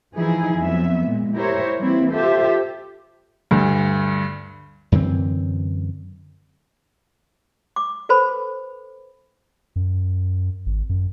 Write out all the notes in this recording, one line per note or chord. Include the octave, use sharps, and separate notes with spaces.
E3 F3 D#4 E4 G#4
F2 F#3 B3 E5
A#2 G#3
E4 G4 A#4 C5 C#5 E5
E3 G3 A#3 C4 E4
F4 G4 A4 C5 E5
D2 G2
F#2 D3 E3 C4
D6
A4 B4 C5 B5
F#2
G#1
F#2